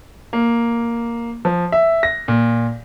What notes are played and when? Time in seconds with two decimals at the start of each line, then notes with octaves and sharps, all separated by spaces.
0.33 A#3
1.45 F3
1.72 E5
2.03 A#6
2.28 A#2